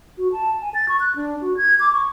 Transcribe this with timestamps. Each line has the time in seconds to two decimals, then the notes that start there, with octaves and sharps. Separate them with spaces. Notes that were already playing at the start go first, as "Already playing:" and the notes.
0.18 F#4
0.32 A5
0.62 G#5
0.74 A6
0.89 C#6
1.00 F#6
1.16 D4
1.41 F#4
1.57 G#6
1.80 D6
1.93 C#6